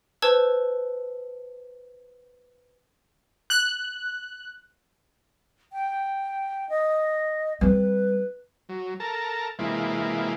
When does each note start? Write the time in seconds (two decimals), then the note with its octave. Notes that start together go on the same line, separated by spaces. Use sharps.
0.22 B4 C5 A5 E6 G#6
3.50 F#6
5.73 G5
6.69 D#5
7.61 G3 C4 B4
8.69 F#3
9.00 A4 A#4 A5 A#5
9.59 C3 E3 G#3 A#3 E4 F4